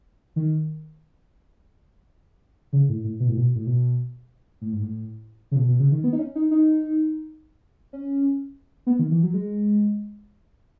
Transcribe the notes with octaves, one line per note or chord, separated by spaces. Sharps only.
D#3
C#3
A2
A2
B2
A2
B2
A2
B2
A2
G#2
A2
C#3
B2
B2
C#3
D#3
B3
D#4
C#4
D#4
D#4
C#4
B3
D#3
E3
F#3
G#3